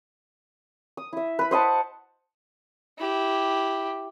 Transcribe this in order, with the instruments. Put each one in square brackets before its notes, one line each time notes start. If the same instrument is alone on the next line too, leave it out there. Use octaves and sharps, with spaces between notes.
[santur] D#6
E4 E5
B4 B5
C5 D#5 F#5 A5
[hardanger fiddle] E4 G4